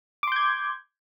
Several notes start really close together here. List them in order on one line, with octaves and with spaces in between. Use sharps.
D6 C6 G6 G#6